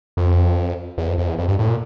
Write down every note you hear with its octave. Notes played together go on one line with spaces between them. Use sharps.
F2
E2
F2
F2
E2
F2
G2
A2
A#2